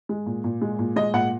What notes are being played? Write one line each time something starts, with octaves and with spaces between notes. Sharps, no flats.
G#3
A#2
A#2
G#3
A#2
G#3 D#5
A#2 F#5